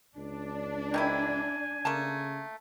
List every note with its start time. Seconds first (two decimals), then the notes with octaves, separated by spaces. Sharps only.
0.17 C#2 D4
0.94 D#3 C4 E4 G#5
1.85 C#3 A3 A#3 A5